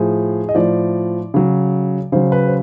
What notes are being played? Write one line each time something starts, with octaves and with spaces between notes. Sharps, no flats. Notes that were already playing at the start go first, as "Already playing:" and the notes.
Already playing: A2 F3 G#4
D#5
A2 F3 D5
C#3 F#3
C#3 F#3 C5
B4
C5